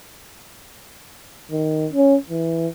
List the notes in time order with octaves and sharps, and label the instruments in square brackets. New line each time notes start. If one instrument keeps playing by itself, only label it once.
[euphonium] D#3
C#4
E3